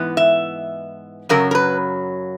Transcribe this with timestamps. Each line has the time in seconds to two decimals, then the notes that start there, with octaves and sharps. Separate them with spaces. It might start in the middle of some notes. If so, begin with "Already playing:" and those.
Already playing: G#2 E3 B3
0.17 E5
1.29 F#2 C#3 F#3 A#4
1.51 A#4
1.55 B4